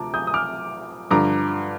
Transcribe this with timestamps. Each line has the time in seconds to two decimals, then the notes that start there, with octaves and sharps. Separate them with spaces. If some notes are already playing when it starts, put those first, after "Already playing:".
Already playing: D2 C3 F3 A5 A#5 D6
0.14 D#6 G6
0.27 D#6
0.34 D6 F6
1.11 G2 D3 F3 A#5 D6